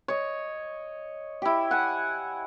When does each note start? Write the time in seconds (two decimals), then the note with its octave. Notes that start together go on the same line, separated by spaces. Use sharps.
0.08 C#5 D#5
1.42 E4 G4
1.71 F#5 G#5